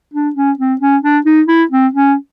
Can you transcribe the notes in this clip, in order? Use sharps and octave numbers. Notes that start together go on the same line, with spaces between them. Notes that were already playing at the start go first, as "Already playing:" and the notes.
D4
C#4
C4
C#4
D4
D#4
E4
C4
C#4